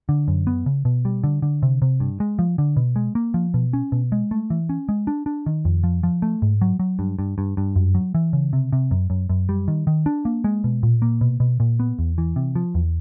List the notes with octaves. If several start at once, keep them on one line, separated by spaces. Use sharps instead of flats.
D3
F#2
B3
C#3
B2
G3
D3
D3
C3
C3
G2
G#3
F3
D3
B2
G#3
A#3
F3
B2
C#4
B2
G#3
A3
E3
C#4
G#3
D4
D4
D#3
F2
F3
F3
A3
G#2
F#3
F#3
G2
G2
G2
G2
F#2
F#3
E3
C#3
C3
C3
F#2
F#2
F#2
G3
D#3
D#3
D4
A#3
G#3
B2
A#2
A#3
B2
B2
A#2
B3
E2
E3
C3
F3
E2